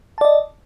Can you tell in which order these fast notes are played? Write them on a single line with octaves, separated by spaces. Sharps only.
A5 D5 D#5